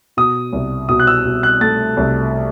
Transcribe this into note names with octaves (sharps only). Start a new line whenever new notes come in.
B2 D#6
C2
B2 D#6
F#6
E6
B2
F#6
A3 A6
C2